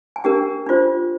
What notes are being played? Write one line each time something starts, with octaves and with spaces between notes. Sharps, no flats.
G#5
D4 G4 A#4 G5
D4 F4 C5